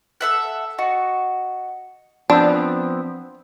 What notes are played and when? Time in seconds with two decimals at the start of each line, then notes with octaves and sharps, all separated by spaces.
0.21 A4 E5 F#5
0.79 F#4 D#5 F#5 C#7
2.30 F3 B3 C4 D4